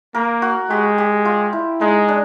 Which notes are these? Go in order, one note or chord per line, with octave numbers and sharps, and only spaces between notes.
A#3 A#4
F#4
G#3 G4
G4
F4
E4
G#3 D#4
D4